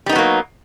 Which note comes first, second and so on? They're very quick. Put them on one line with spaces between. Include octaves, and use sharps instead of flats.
G3 D#4 B3 F#3 A#3